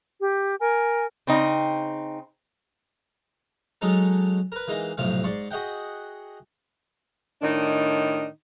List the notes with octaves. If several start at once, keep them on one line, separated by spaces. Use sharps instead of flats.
G4
A#4 G#5
C#3 C4 D#4
F#3 G#3 C#4 D#4 A4
A#4 B4
E3 G#3 A#3 D#4
B1 F2 A2 C3 F5
G#2 D5 C6 C#6
F#4 G#4 D#5 E5 F#5 G5
A2 D#3 D4 D#4